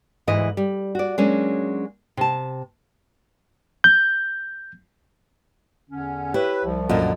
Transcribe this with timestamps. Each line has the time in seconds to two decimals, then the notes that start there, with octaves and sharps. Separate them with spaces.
0.27 D2 G#2 E3 D#5
0.57 G3
0.95 F#4 D5
1.18 F#3 G#3 A#3 C#4 D4
2.17 C3 A5
3.84 G6
5.90 E2 D3 C#4
6.34 E4 G4 B4 C#5
6.65 C2 F3
6.89 F#2 A#2 D3 F4 D#5